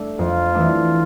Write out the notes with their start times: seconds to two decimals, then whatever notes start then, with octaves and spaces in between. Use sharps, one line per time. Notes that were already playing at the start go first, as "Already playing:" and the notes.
Already playing: A3 D4
0.19 F2 F4
0.54 E3 A3 D4